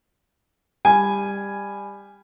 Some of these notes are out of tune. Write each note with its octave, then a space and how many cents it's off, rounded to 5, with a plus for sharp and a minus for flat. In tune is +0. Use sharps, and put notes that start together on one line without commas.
G3 +20 G#5 +0